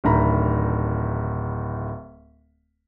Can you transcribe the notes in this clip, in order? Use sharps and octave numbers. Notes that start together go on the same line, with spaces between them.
D1 A2 D#3 D4 A#5 B5